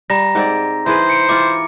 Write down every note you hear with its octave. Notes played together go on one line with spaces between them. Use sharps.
G3 A#5 A#6
G#2 C4 D5
E3 G#4 B4 C5
C#7 D7
E3 F4 D6